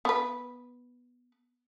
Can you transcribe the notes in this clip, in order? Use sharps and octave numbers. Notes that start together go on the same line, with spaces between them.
B3 B4